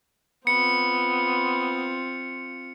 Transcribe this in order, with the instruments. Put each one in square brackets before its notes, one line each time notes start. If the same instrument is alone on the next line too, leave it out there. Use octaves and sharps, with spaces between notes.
[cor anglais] B3 [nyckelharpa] C4 F4 [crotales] C#7